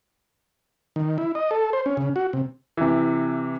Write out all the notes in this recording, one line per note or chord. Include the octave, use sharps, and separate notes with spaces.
D#3
E4
D#5
A4
C5
C#4
C#3
F#4
C3
C3 E3